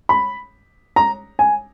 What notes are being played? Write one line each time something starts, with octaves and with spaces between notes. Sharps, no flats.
B5
A#5
G#5